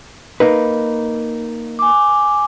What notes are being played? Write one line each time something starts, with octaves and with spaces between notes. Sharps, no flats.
A#3 D#4 B4
G#5 D6